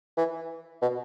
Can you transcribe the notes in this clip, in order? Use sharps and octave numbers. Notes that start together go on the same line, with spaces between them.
E3
B2